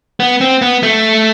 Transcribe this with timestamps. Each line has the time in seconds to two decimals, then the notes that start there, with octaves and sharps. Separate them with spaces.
0.20 B3
0.41 C4
0.62 B3
0.83 A3